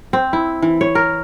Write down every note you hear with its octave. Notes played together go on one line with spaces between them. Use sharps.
C4
E4
E3
C#5
A#4